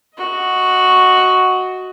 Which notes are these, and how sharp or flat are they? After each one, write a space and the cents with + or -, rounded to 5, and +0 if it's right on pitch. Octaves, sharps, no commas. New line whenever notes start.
F#4 +0 D#5 +20